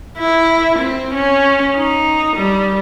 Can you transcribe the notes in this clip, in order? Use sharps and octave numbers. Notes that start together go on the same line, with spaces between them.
E4
C4
C#4
D#4
G3